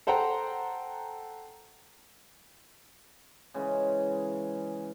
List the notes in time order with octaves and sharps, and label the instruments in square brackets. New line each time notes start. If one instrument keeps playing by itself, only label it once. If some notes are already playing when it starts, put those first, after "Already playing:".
[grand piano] A4 C5 F#5 G5 A#5
[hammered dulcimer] C#3 E3 G#3 C#4